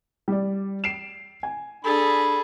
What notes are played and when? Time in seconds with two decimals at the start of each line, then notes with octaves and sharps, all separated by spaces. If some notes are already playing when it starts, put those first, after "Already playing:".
0.28 G3 D5
0.84 C7 D7 E7
1.43 G#5
1.85 D4 G#4 A4 B5